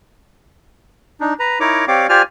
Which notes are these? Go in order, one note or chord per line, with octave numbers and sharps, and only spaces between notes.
D4 D#4
B4 A#5
D#4 E4 A#4 C#5 A#5 D6
C4 G4 C#5 D5 F5 D6
F4 G4 C5 D5 G#5 F6